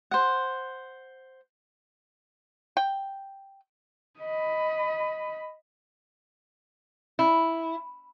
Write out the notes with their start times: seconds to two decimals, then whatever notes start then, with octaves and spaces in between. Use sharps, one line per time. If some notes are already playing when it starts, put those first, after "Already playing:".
0.11 C5 F#5
2.77 G5
4.20 D#5 B5
7.19 E4